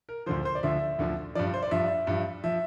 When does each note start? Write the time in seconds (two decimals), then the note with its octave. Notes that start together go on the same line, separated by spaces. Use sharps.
0.09 A#4
0.26 D2 D3 F3 C5
0.45 C5
0.55 D5
0.63 D2 D3 F3 E5
0.99 D2 D3 F3
1.35 G2 F3 D5
1.54 C5
1.63 D5
1.71 G2 F3 E5
2.07 G2 F3
2.44 F3 E5